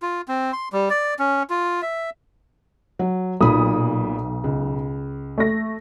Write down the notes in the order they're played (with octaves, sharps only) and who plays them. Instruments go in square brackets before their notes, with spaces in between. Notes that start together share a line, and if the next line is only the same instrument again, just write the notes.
[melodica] F4
C4
C6
G3
D5
C#4
F4
E5
[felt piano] F#3
[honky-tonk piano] B1 D#6 [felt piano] A#2 B5
[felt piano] C#2
[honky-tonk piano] A3 A#6